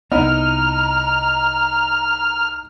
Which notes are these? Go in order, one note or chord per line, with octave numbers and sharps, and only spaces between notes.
C2 B3 D#4 E4 D#5 A#5 F6